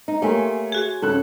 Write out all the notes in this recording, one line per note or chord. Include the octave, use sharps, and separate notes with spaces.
D#4
A3 A#3 G4 C#5 G#5 C6
F#4 G#4
D#1 C#4 A4 F#6